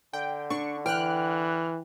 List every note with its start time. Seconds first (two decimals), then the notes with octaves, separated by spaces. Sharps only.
0.13 D3 G5
0.50 D4 C#6
0.86 E3 G5 F6 F#6